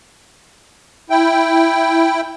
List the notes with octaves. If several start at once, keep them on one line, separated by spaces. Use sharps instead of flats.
E4 G5